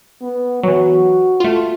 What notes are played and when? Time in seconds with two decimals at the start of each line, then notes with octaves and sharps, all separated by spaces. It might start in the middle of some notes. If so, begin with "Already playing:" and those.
0.22 B3
0.64 E3 F#3 F#4
1.40 A3 F4